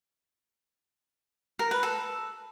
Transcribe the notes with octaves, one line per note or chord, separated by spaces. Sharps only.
A#4
B4
A4